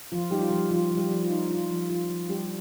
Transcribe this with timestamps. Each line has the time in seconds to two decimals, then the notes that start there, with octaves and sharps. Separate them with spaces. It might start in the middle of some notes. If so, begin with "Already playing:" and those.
0.12 F3 F4
0.31 G3 D#4 G4
0.41 F4
0.50 F3 G3 G4
0.70 F3 F4
0.91 F3
0.97 G3 G4
1.11 F3
1.23 F4
1.30 D#4
1.50 D4 F4
1.70 F3
1.89 F3 F4
2.09 F3
2.29 G3 D4 G4